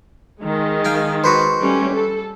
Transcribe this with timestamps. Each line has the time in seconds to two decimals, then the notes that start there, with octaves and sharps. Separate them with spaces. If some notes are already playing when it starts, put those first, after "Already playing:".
0.40 D#3 G#3
0.85 F5 G5 G#5
1.24 F#4 B4 C5
1.61 G3 A3 C#4
1.94 A4